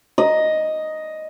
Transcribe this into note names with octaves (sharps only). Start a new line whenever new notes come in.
D#5